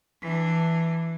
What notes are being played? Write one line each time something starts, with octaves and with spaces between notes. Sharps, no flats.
E3 D4